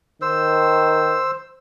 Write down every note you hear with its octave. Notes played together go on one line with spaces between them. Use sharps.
D#3 C5 E6